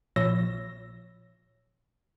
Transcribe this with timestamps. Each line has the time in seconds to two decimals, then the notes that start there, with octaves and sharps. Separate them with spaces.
0.16 A#1 A#2 F3 C#5 E6 A#6